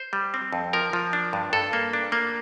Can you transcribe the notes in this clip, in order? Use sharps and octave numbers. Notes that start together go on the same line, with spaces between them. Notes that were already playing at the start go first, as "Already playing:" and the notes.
Already playing: C5
G3
C4
F2
F3 A#4
F3
D4
G2
G2 A4
A#3
D4
A#3